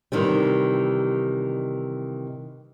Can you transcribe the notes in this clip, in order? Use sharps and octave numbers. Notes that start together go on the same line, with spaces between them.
C3 D#3 E3 G3